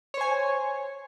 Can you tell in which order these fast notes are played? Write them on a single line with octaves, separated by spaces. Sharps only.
C#5 C5 G#5